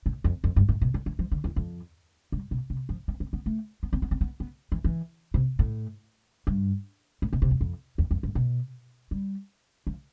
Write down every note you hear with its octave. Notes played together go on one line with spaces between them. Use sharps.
A2
F2
F2
G2
A2
B2
D3
E3
F3
D3
E2
F2
G2
B2
C3
F3
B3
C4
B3
A3
B3
C4
B3
C4
B3
B3
E3
E3
C3
A2
G2
A2
B2
C3
E2
F2
E2
F2
G2
B2
G3
F3